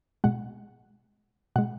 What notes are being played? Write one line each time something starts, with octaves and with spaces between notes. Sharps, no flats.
B2 G#3 F#5
B2 G#3 F#5